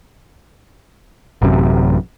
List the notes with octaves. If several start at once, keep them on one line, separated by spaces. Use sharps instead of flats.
A1 F#2 C3